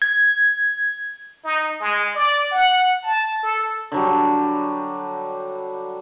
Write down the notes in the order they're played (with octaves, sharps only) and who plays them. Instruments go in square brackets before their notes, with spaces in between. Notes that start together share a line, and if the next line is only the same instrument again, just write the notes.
[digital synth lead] G#6
[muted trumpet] D#4
G#3
D5
F#5
A5
A4
[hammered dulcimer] D3 F#3 G3